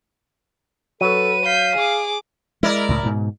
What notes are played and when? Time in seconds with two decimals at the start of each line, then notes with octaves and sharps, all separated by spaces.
1.01 F#3 A4 B4 D#7
1.45 F5 G6 B6
1.75 G#4 D6
2.63 G#3 E4 A#4 D5
2.89 C#2 A2
3.03 G#2 B2